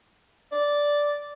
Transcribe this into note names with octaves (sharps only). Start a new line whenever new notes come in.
D5